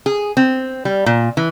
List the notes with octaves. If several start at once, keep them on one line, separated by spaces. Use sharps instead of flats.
G#4
C4
G3
A#2
E3